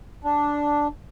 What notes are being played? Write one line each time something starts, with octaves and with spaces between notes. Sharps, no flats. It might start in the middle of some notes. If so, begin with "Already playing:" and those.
D4